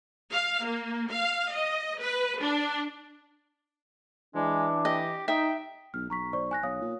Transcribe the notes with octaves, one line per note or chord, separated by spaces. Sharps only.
F5
A#3
F5
D#5
B4
D4
E3 G#3 D4
G4 D#5
D#4 E5 G5
B1 F6
B1 A#5 C#6 B6
C5 D5 C#6
G#5 F#6 A#6
B1 C#5 F5 D#6
A#2